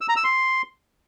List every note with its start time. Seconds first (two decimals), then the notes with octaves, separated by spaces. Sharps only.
0.01 E6
0.09 A#5
0.16 E6
0.24 C6